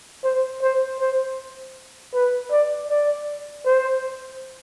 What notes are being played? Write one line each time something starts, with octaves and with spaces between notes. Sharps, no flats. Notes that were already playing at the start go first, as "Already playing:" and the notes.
C5
C5
C5
B4
D5
D5
C5